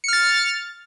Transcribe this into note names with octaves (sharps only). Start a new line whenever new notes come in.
F6 A6 C#7